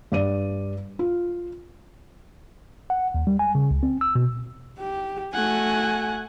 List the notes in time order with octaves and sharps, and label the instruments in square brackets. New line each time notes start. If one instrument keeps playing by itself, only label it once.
[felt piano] G2 D5 D#7
F4
[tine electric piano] F#5
D#2
G3
G#5
C#3
C#2
C4
E6
B2
[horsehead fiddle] G4
[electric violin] A3 F#5 [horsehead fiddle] F#4 G#5